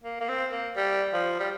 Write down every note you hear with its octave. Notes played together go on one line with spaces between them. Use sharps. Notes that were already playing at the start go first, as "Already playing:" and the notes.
A#3
A#3
C4
A#3
G3
F3
G3